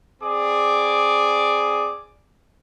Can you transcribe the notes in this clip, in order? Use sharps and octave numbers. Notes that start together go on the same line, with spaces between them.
C4 G#4 D5 D6